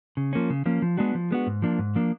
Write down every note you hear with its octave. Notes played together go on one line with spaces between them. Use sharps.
C#3
F3 A#3 C#4
C#3
F3 A#3 C#4
F3
G#3 B3 D4 F#4
F3
G#3 B3 D4 F#4
G#2
F3 A#3 D4
G#2
F3 A#3 D4